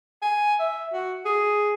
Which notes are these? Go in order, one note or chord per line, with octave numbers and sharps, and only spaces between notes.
G#5
E5
F#4
G#4